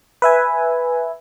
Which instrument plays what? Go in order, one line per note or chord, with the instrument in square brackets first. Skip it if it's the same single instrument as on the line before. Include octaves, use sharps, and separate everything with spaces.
[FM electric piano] B4 E5 G#5